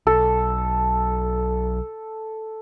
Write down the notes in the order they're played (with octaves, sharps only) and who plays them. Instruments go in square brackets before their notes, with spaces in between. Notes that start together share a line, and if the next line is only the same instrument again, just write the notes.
[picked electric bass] B1 [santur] A4